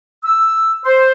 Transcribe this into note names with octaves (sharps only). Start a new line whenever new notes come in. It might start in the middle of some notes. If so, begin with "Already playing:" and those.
E6
C5